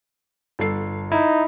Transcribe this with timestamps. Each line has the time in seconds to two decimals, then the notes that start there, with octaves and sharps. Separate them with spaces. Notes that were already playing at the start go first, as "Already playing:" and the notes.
0.59 G1 A4 C7
1.12 D#4 E4